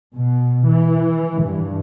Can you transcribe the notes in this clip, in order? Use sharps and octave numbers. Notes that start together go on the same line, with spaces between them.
B2
E3
G2